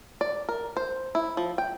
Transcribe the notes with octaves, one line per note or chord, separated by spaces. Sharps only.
D5
A#4
C5
E4
F3
G5